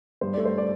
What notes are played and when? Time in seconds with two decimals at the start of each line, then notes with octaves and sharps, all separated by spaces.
0.21 G2 C5
0.34 A3 D5
0.45 C5
0.58 D5